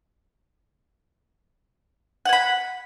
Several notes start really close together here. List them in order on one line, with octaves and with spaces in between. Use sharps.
F#5 G#5 B5